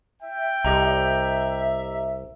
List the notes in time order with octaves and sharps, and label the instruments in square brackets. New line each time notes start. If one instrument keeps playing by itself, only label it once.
[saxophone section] E5 [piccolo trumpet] G5
[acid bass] C2 [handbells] G4 D#5 A#5